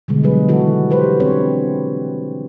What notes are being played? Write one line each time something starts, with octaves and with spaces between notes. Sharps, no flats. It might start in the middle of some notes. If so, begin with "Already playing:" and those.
B2 D3 G3 G#3
F#3 G#4 B4
D#3 E3 G3 E4 F#4 A4
G4 B4 C5
C4 D4 C#5